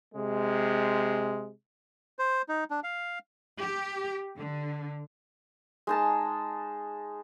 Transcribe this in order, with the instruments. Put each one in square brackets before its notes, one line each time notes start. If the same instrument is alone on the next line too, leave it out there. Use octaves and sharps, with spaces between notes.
[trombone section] C3 G#3
[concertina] C5
D#4
D4
F5
[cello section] G4
D3
[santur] G#3 D#4 A5